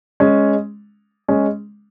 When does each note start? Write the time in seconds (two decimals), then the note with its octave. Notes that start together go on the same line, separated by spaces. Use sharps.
0.20 G#3 C#4
1.28 G#3 C#4